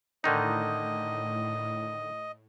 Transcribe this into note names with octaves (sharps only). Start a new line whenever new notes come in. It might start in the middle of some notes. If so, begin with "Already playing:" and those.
A2 D3 D#3 D#4 D#5